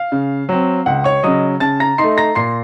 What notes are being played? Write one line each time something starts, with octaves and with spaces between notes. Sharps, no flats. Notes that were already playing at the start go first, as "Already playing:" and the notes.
Already playing: F5
C#3
F#3 C4
C#2 F#5
C#5 C#6
C#3 F#3 D#5 D#6
C#3 A5 A6
A#5 A#6
A3 D#4 C6 C7
A#5 A#6
A#2 C6 C7